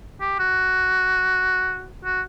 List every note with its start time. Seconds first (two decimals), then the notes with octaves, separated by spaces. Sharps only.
0.21 G4
0.39 F#4
2.05 F#4